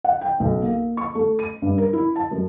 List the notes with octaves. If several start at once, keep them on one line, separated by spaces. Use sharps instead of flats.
F#5
G5
B1
A#3
C#6
A3
D#7
G2
A#4
E4
A5
F#2